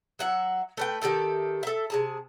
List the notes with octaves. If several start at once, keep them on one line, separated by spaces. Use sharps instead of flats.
F#3 E5 F#5
A3 B4 G5
D#3 G4 A4 E5
A4 E5
C3 G#4 A5